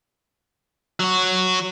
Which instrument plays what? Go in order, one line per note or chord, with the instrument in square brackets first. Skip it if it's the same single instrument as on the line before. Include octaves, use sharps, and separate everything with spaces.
[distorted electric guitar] F#3 F#4